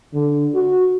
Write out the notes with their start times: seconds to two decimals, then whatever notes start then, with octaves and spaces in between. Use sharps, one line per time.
0.14 D3
0.55 F#4